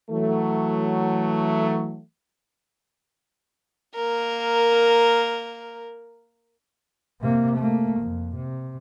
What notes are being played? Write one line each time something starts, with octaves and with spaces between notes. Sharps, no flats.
E3 F#3 A3
A#3 A#4
C3 A#3
A3 A#3
F2
C3